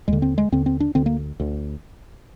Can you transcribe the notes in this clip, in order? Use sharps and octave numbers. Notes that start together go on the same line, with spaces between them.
D#2 D3 G#3
C4
G#3
D#2 D3 C4
C4
D4
D2 D3 C4
A#3
D2 D3